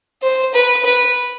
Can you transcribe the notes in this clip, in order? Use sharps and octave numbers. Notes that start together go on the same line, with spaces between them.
C5
B4
B4